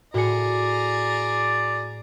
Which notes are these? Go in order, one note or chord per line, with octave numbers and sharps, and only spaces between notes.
A2 F#4 G#4 D5 A#5 C#7